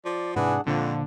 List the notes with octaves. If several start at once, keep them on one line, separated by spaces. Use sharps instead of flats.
F3 D5
G#2 C3 E3 D4 G#4 F#5
F2 A#2 D3 F3